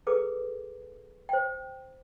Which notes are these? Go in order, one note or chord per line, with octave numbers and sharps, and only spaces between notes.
G#4 A4 B4 D6
C5 G5